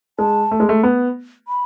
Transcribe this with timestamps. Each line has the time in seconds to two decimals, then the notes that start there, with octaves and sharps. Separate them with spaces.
0.19 G#3 A5
0.51 A3
0.60 G#3
0.69 A3
0.83 B3
1.48 B5